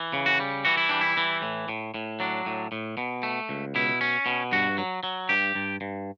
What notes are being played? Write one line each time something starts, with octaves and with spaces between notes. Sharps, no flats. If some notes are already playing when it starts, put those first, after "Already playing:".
Already playing: E3
C#3
F#4
G3
E3 F#4
E4
G3 D4
E4
E3
A2
A2
A2
F#3 D4
A2
A2
B2
A3
C#2
B2 E4
C#4
B2
G2 F#4
F#3
F#3
G2 G4
G2
G2